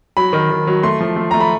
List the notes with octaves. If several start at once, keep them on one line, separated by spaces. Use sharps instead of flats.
F#3 B5
D#3
D#3
F#3
A3 C6
F3
A3
A3 A#5
B5